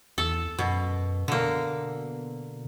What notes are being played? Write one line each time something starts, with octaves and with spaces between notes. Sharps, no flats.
E2 A4
F#2 B2
B2 D3 A#3